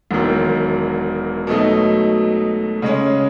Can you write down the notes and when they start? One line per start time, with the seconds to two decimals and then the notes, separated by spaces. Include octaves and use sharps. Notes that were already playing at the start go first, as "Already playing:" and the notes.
0.11 E1 E2 D#3 F#3
1.47 B2 F#3 A3 D#4
2.82 C#3 G#3 C#4